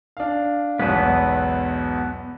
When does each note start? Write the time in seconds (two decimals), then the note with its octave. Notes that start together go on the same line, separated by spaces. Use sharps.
0.17 D4 F5
0.79 B1 E2 G#2 B3 B4